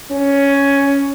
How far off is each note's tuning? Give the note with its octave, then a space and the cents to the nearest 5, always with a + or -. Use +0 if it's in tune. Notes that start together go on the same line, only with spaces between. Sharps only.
C#4 +10